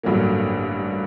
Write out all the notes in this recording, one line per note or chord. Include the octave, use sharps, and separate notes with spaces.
A1 G2 D3 F#3 A#3